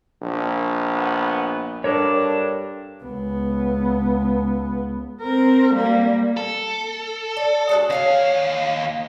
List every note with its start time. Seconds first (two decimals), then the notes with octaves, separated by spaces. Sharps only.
0.22 A#1
0.95 B3
1.84 G2 D4 A4 A#4 C#5
3.04 C#2 B3
5.22 C4 A#4
5.75 G3 A#3
6.37 A4
7.37 D5
7.69 G#3 D4 F#4
7.90 D#2 C#5 E5 F5 G#5